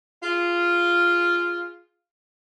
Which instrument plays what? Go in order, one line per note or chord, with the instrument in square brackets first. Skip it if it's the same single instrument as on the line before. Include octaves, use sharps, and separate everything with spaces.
[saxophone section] F4 G#4